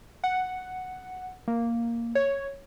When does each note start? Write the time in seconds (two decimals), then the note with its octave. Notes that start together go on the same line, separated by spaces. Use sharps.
0.24 F#5
1.48 A#3
2.15 C#5